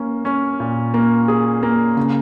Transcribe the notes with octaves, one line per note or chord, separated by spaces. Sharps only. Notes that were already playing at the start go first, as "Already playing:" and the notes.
Already playing: A#3 C#4
C#4
A#2
A#3
G#4
A#3
C#3